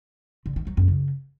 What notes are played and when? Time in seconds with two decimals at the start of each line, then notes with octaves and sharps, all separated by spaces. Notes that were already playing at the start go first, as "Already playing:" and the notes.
0.46 D3
0.56 D#3
0.67 F#3
0.77 F#2
0.88 C#3